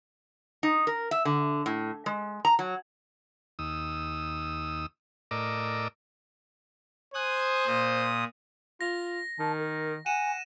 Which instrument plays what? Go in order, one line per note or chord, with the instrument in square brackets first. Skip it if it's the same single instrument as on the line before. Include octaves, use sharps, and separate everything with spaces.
[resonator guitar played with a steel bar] D#4
A#4
E5
D3
A2
G#3
A#5
F#3
[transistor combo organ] D#2 D#6 E6
A2 A#4 D5 D#5 D6 E6
[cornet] C5 [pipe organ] G#5 D#6 F#6
[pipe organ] A#2 D#6
[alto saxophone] F4 [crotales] A#6
[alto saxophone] D#3 [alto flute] A5
[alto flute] A#4
[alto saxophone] F#5 [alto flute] G#5 [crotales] D#7 E7